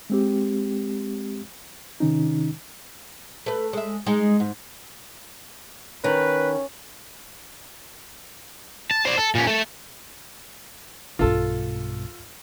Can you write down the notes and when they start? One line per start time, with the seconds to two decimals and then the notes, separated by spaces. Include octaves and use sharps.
0.10 G#3 C4 G4
2.00 C3 D#3 C#4 D#4
3.46 A3 B4
3.73 G#3 E5
4.06 G#3 D#4
4.40 G#2
6.04 D#3 C#4 B4
8.91 A5
9.06 C5 D5
9.18 A4
9.35 A#2 C#4
9.47 A3 A4
11.19 B1 G2 F4 A4